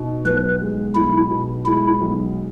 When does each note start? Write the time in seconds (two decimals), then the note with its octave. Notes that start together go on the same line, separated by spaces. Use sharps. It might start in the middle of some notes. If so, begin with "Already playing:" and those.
Already playing: B2 D#4
0.25 B1 B4
0.61 G#3
0.96 B1 E4
1.30 B2
1.66 G#3 E4
2.01 B1